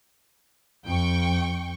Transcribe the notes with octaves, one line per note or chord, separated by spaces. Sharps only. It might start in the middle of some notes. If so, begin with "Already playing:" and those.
F2 G5 C#6